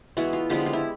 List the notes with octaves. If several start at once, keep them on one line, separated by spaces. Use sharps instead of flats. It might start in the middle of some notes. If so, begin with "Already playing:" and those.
E3 G#3 B3 F#4
F4
D3 F3 G#3 B3 G4
F4
E4